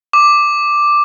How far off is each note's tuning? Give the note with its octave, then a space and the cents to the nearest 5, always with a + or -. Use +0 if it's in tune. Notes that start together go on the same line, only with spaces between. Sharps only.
D6 +5